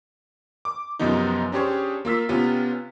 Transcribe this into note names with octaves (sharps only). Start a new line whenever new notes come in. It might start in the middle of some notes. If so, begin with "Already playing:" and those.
D6
F#2 C3 F3 B3 D#4
C#4 D4 G4 G#4 C5 C#5
A#3 F4 E6 B6
C3 B3 C#4 F4